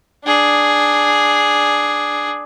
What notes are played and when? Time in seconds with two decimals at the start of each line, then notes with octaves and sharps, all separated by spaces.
0.25 D4 G#4